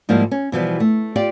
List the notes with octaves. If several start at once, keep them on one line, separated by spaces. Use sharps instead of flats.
G#2 F3 G3 A#3 E4
C#4
B2 E3 F3 G3
A3
F4 G4 D5